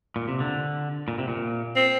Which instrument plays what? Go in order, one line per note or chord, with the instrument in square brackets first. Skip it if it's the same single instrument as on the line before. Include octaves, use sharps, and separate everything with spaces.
[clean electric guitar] A#2
C3
D3
A#2
C3
A#2
[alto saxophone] C4